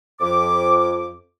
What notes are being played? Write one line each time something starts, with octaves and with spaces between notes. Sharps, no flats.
F2 D6